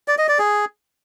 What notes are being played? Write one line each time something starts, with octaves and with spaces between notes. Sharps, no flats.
D5
D#5
D5
G#4